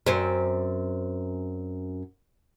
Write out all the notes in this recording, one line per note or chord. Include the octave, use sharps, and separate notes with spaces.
F#2 C4